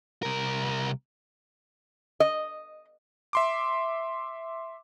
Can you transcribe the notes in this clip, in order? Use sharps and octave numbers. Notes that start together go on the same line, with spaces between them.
C2 A#4
D#5
E5 C6 D6